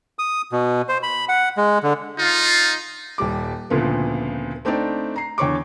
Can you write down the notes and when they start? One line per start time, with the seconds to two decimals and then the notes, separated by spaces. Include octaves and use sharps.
0.19 D#6
0.52 B2
0.89 C5
1.03 B5
1.29 F#5
1.57 G#3
1.83 D3
2.19 D#4 F4
3.18 D#1 G3 D6
3.70 D2 A#2 C#3 F3 B3
4.65 A3 C4 D4 D#4 D5
5.16 A#5 C7
5.38 E2 D3 C#5 C#6 D6